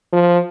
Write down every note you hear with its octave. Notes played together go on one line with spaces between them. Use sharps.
F3